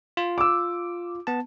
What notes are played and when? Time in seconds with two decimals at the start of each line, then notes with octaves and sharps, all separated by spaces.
0.17 F4
0.38 D6 E6
1.27 B3 A5